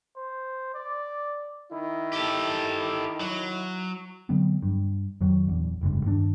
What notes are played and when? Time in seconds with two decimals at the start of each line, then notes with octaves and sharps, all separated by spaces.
0.17 C5
0.75 D5
1.71 D#3 E4
2.13 G4 A4
3.20 F#3
4.29 D3 F#3 B3 C4
4.63 G2
5.21 F2 D#3 F#3
5.48 A#1 E2
5.81 F1 G2 C#3 G#3
6.04 G2 D#3 C4 D4